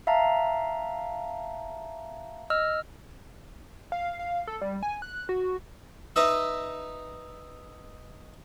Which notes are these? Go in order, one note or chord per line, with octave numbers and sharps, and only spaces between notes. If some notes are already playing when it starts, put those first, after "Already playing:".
E5 F5 A5 A#5
D#5 E6 F6
F5
F5
A4
G3
G#5
F#6
F#4
D#4 B4 D#5 E5